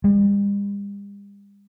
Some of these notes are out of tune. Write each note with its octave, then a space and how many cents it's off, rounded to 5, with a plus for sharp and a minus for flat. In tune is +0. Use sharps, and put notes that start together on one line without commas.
G3 +45